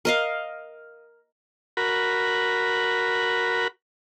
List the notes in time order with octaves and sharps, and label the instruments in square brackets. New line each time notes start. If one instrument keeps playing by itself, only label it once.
[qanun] A#4 D#5 F5
[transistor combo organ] F#4 A#4 B5